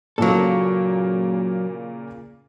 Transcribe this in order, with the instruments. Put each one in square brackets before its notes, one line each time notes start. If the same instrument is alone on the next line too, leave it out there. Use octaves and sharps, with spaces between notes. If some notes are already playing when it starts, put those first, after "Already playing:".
[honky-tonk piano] A#2 C#3 A#3 [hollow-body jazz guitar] F#3 A4